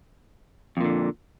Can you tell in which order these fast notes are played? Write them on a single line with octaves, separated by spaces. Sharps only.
F2 A#2 D3